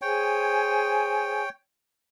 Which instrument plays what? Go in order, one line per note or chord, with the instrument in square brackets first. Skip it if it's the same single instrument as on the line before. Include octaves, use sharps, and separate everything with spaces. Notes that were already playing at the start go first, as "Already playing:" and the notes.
[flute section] G#4 C5 G#5 [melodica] C#5 G5